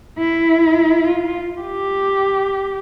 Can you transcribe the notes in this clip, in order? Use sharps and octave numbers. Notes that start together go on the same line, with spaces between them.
E4
F4
G4